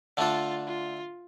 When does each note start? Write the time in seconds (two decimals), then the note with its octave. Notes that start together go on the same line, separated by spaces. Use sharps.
0.17 D3 A3 D4 F4 A4
0.67 F4